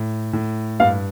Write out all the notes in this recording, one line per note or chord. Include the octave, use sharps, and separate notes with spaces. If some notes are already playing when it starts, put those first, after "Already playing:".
Already playing: A2
A2
G2 F5